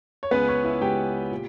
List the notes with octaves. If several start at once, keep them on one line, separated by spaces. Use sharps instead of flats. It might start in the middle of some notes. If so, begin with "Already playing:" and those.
C#5
C#2 C#3 G#3 B3 B4
C#4 C#5
E4 E5
C#2 C#3 G#3 G4 G5
A#2